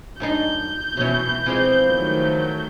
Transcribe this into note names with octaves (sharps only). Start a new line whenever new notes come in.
F#2 D4 D#4 G6
B2 E3 F#3 C#4
E3 F3 G#3 C4
D#3 F#3 A3